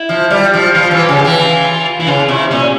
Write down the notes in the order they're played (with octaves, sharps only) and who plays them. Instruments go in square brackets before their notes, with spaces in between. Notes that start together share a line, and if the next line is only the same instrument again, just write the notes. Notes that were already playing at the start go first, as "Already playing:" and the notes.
Already playing: [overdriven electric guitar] E4
[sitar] F3
G3
F3
[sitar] F3 [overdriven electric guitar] F4
[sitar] E3
[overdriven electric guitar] G4
[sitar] C#3
[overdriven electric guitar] G4
[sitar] E3
[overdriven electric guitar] F4
[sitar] E3 [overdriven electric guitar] E4
[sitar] C#3 [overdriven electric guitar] F4
[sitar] C3 [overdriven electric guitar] E4
[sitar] A#2 [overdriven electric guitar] C#4